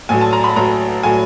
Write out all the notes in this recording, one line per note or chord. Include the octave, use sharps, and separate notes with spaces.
A1 A2 F#3 G#5
A5
A#5
B5
A1 A2 F#3 A#5
A2 F#3 G#5